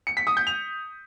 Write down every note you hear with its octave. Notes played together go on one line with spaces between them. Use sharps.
C#7
B6
D#6
G6
F7